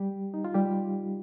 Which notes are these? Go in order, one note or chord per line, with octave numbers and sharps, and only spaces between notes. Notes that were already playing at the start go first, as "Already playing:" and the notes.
Already playing: G3 G4
D#4
F4
G3 G4